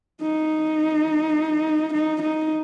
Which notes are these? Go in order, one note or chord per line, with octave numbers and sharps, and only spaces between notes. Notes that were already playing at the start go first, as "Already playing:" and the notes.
D#4
D#4
D#4